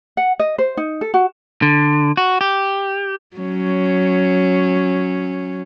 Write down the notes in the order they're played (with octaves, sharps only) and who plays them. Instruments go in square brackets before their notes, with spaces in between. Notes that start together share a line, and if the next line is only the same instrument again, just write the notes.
[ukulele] F#5
D#5
C5
D#4
A4
F#4
[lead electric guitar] D3
F#4
G4
[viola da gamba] F#3 C#4